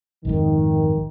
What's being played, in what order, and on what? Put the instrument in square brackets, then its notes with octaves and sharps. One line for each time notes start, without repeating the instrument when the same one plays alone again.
[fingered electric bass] A#1 F2 G#2 [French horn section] D#3